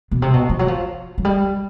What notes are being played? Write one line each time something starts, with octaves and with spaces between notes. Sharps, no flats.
B2
C3
B2
F3
F#3
F3
F#3
G3